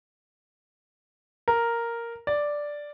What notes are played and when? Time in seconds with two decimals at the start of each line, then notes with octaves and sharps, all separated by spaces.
1.48 A#4
2.27 D5